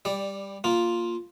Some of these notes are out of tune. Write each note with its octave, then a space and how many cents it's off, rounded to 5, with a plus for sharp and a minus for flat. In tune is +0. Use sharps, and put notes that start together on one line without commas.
G3 +15 D5 +0
A#3 +0 F4 +0